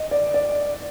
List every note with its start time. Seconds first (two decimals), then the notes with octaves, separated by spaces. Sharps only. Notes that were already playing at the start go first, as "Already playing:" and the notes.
Already playing: D#5
0.11 D5
0.34 D5